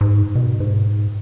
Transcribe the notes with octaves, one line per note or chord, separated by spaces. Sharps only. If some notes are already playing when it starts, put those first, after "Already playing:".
G#2
B2
G#2